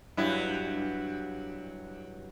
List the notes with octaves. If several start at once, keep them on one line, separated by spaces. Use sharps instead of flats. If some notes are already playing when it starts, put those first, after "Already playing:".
G2 F#3 E4